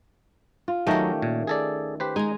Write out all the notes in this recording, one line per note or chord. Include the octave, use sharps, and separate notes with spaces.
F4
D#3 F#3 A3 C#4 G4 D#5 A#5
A#2
G#4 A4 D5
G4 B4 C5
G#3 D#4 G#5 A#5